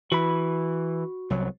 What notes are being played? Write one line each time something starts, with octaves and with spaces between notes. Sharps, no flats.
E3 F#4 B5
C2 F#3